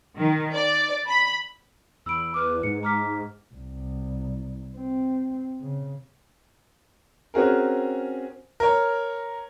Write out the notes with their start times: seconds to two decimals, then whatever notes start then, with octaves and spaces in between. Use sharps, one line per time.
0.18 D#3
0.53 D5
1.08 B5
2.06 E2 B5 E6 D7
2.34 B4 D6 F6
2.63 G#2 C#7
2.83 A#5 D6 F6 B6
3.55 C2
4.76 C4
5.61 C#3
7.34 C4 C#4 F#4 G#4 A#4
8.60 A#4 C#5